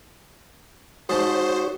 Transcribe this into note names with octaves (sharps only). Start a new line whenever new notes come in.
G#2 F#4 C5 C#5 A5